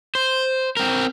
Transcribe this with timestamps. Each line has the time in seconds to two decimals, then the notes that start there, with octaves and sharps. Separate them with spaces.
0.15 C5
0.77 C4 A#4